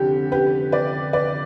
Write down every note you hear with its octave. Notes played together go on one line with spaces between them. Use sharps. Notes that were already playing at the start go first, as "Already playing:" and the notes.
Already playing: F1 D3 G4
G4 B4
B4 D5
B4 D5